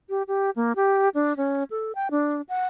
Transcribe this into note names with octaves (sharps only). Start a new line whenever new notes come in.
G4
G4
A#3
G4
D4
C#4
A4
G5
D4
F#5